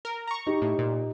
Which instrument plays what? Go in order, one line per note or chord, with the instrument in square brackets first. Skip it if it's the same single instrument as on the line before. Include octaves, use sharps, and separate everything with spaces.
[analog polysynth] A#4
A#5 C#6
[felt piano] D#4 G4
[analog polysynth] A2
A#2